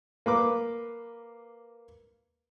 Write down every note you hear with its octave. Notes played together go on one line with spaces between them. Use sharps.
A#3 B4 D6